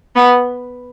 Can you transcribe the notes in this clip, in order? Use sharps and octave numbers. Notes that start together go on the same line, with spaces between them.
B3